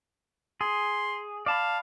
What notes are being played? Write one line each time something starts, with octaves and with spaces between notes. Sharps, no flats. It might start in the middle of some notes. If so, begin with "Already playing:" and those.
G#4 C6
D5 F5 A5 B5